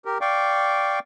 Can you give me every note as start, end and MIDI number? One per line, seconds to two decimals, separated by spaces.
0.05 0.18 67
0.05 0.18 70
0.21 0.99 74
0.21 0.99 77
0.21 0.99 79
0.21 0.99 85
0.21 0.99 86